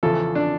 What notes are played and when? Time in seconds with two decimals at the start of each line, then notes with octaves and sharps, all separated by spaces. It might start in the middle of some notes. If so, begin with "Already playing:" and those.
0.03 E2 C#3 F3 A4
0.35 D4